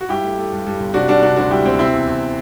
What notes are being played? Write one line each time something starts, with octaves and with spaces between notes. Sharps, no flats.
F#4
G2 E4 G4
A3
A3
G2
G2
G1
C3 D4 F#4
G3 D4 F#4
C3 D4 F#4
D2 D4 F#4
G3 E4 G4
D2 C4
C3 C4 E4
E2
E2